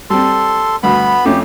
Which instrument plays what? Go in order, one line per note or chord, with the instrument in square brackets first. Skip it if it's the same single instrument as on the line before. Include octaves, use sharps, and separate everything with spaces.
[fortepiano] G3 C4 [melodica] A4 C6
[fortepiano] D2 G2 [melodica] B3 B5
[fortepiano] F2 A3 C#4 [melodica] G4